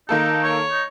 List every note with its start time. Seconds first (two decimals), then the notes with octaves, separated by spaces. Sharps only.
0.09 D#3 A#3 D#4 A4
0.43 C#5
0.72 D#4